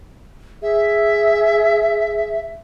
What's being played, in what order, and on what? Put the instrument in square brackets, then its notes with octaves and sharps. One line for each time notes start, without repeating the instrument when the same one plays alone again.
[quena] G#4 [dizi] E5